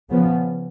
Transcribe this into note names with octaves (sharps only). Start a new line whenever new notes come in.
C#3 F3 B3